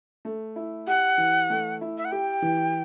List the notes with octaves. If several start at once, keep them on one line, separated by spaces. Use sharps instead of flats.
A3
E4
G4 F#5
E3
A3
E4
E5
F#5
G4 G5
E3